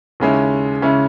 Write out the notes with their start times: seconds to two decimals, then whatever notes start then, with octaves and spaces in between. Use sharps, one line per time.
0.20 D#2 C#3 G#3 C#4 E4
0.82 C#3 G#3 C#4 E4